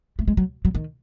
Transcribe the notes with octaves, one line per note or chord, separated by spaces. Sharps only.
A3
G#3
F#3
F#3
D#3